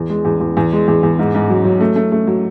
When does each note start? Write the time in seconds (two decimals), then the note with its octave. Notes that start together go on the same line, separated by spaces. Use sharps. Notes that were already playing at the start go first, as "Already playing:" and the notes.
Already playing: E2
0.09 G#3
0.25 E2
0.41 E2
0.57 E2
0.72 G#3
0.88 E2
1.03 E2
1.19 G#2
1.35 G#2
1.50 F#3
1.65 F#3
1.81 A3
1.96 A3
2.12 A3
2.27 F#3